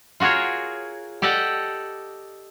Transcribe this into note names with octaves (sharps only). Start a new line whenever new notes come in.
F4 F#4 G#4 A#4 C#5
G4 A4 D5 D#5 F#5 G5